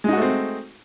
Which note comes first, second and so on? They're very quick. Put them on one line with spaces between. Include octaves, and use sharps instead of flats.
G#3 D#4 F#4 A3 C4